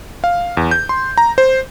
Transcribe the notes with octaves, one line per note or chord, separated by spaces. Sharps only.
F5
E2
G6
C6
A#5
C5